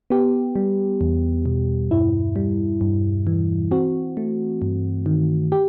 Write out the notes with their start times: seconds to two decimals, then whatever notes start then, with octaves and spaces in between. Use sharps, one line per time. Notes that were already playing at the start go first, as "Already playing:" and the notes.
0.10 B3 G4
0.56 G3
1.01 E2
1.46 B2
1.91 G2 E4
2.36 G3
2.81 G2
3.27 E3
3.71 C4 F#4
4.17 A3
4.62 G2
5.06 D#3
5.52 G4